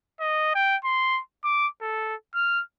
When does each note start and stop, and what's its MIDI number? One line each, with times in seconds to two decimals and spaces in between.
0.20 0.55 75
0.55 0.77 79
0.85 1.21 84
1.44 1.68 86
1.82 2.15 69
2.34 2.62 89